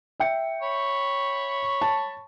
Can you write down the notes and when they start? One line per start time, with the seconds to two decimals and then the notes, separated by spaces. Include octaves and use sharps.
0.20 E5 G5 C#7
0.62 C#5 B5 C#6
1.82 A5